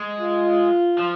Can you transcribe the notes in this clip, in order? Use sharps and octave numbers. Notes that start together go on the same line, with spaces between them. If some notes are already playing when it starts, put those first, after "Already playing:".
Already playing: G#3
F4
F3